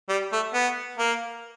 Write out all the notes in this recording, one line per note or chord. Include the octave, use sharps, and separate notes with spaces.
G3
A3
B3
A#3